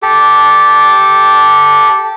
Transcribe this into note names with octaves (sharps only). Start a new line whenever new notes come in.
G4 A4